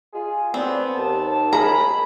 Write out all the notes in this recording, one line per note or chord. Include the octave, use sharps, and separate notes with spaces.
F4 G#4
D2 F#3 B3 C4 D4
D#2 A5
G#4 A#4 A#5 B5